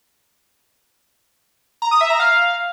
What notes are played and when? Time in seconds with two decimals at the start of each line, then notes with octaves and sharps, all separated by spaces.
1.82 A#5
1.91 D#6
2.01 E5
2.10 A#5
2.19 F5